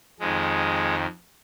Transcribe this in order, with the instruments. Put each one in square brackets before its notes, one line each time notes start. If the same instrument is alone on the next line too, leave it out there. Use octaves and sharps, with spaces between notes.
[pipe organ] F2 D#3 G#3